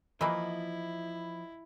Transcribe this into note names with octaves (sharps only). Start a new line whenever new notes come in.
E3 F3 A#3 E4 D#5 B5